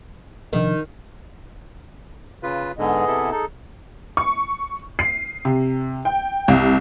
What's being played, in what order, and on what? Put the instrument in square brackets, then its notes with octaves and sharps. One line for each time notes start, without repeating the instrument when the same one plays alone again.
[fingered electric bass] C3 F3 D4 [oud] D#3
[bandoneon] C#3 F4 B4
[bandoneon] G#2 D3 [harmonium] B3 G#4 D#5
[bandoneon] C3 E4 A4
[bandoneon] D#4 A4 [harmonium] G#4
[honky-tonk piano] C#6
C7
C3
G5
C2